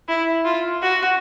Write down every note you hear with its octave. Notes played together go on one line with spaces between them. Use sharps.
E4
F4
F#4